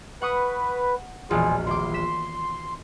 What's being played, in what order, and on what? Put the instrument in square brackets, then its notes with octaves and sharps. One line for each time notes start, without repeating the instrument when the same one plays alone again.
[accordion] B4 [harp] F#5 C#6 D#6
[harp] E1 A#1 F4 [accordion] G#4 C5
[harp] D#1 D6 [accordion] C6
[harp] B6 E7